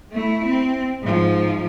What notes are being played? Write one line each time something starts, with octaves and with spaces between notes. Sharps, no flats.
A3 E4
C4
G#2 F3